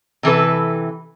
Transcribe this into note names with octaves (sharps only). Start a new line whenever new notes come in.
C3 E3 A4 B4